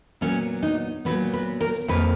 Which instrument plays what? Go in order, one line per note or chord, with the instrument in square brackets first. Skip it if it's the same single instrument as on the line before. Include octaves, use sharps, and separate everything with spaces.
[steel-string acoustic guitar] A#2 F#3 B3 C#4
D#4
A#2 F#3 B3 B4
B4
A#4
F2 D#3 A#3 B4